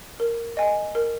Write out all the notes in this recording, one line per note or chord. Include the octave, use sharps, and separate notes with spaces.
A#4
D#5 G#5
A#4